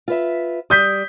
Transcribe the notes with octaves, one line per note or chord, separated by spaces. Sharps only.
F4 B4 E5
G3 D#6 G6 B6